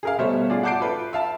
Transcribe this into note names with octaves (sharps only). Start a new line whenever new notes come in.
G#4 A#4 F5
B2 G3 A3 C5 C#5
F4 G#4 D5
F#5 A5 D6 G6 C7 D7
F4 A4 B4
E5 F5 A5